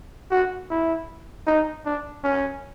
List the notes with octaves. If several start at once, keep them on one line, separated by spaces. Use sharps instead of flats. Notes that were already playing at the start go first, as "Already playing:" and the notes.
F#4
E4
D#4
D4
C#4